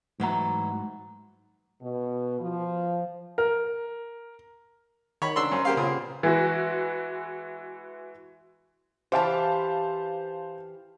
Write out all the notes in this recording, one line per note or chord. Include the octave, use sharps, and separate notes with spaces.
G#2 E3 F#3 A3 A#5
B2
F3
A#4
D#3 C#5 B5
C#3 D4 C5 A#5 C6 E6
F#2 C#4
A#3 C4 G4 F5
A#2 C#3 B3
E3 G#3 F#4
E3 G4 C5 F5 A5